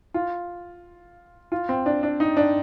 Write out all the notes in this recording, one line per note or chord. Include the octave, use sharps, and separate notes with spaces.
F4
F4
C4
D4
D4
D#4
D4